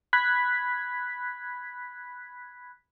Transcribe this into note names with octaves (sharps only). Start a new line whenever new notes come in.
B5 F#6 G#6 B6